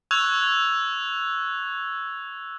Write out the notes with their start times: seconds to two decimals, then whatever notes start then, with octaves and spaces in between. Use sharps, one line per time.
0.11 C#6 E6 F#6 G#6 F7